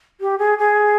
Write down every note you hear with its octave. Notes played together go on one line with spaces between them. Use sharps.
G4
G#4
G#4